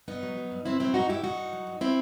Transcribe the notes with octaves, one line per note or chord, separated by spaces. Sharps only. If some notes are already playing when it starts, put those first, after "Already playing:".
G2 B3 D#4
F#3
F#3
G2
G2 C4 E4
F#3 C4 E4
G2 D#4 F#4
G2 E4 G4
G2 D#4 F#4
G2
F#3
G2
C4 E4